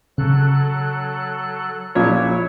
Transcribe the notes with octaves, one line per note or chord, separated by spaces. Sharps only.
C#3 F#3 A4 F#6
A#1 A#2 E4 C#5